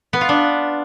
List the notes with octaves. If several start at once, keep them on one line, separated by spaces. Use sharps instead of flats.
B3
F4
D4